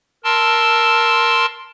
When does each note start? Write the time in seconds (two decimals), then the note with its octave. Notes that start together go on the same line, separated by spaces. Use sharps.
0.24 A#4 A5 C6 E6